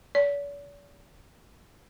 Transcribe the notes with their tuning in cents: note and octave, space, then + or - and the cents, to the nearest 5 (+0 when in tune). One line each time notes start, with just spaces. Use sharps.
D5 -45